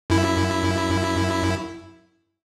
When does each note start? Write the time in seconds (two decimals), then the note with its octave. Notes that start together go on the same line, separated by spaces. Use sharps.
0.10 F#2 E4